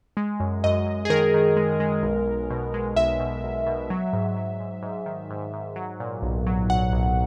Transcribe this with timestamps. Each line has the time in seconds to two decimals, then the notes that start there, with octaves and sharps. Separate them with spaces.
0.17 G#3
0.40 F#2
0.64 F#2 D#5
0.87 F#2
1.05 G#4
1.10 D#3 A#4
1.34 D#3
1.57 G#3
1.80 G#3
2.03 B1
2.27 B1
2.50 B2
2.74 G#3
2.96 B1 E5
3.20 B2
3.43 B1
3.66 B2
3.90 F#3
4.13 G#2
4.37 F#3
4.60 G#2
4.82 G#2
5.06 D#3
5.30 G#2
5.53 G#2
5.76 F#3
6.00 A#2
6.22 B1
6.47 F#3
6.70 B1 F#5
6.92 B1